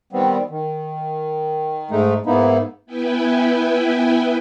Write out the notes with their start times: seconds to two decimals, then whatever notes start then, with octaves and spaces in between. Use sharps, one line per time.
0.13 D#3 G3 B3 C4
0.50 D#3
1.91 G#2 G#3 A3 D#4
2.26 G#2 A#3 B3 D#4 E4
2.86 B3 E4 B4 G5 G#5